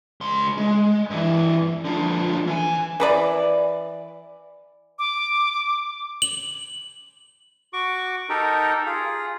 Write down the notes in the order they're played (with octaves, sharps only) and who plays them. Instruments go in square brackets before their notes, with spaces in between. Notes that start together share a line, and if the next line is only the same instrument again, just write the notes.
[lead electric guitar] C#2 C6
G#3
G2 E3
D3 F3
E3 G#5
[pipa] E3 B4 D5
[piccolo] D6
[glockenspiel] F#7
[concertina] F#4 C#6 D6
D#4 G4 A4 A#4
F4 G#4